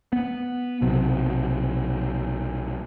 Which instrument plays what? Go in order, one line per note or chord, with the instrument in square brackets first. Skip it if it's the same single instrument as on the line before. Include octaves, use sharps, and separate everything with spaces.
[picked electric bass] B3
B1 C3 F#3